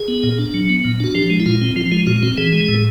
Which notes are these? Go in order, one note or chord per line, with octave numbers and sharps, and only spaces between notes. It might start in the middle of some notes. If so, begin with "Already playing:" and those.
Already playing: G#4
B3
A#2
D4
F#3
B3
A#2
D4 F#4
F3 G4
G#3
E4
A#2 F4
C4
F3 F4
G#3 F4
A#2 F#4
C4 F#4
E3 G#4
G#3
A2